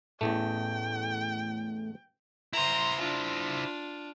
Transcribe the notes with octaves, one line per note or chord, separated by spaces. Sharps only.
A1 E2 A2 A3 G5
E4 C5 A#5 C6
D4 F4